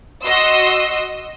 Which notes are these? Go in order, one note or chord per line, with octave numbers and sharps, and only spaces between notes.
F#4 D#5 C6 E6